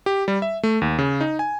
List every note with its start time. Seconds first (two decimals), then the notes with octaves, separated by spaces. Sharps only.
0.06 G4
0.28 G3
0.42 E5
0.63 A3
0.82 D#2
0.99 C#3
1.21 D#4
1.39 G#5